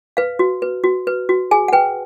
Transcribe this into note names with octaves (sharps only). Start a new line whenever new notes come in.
B4 F5
F#4
B4
F#4
B4
F#4
G#4 G#5
F#5
B4 G5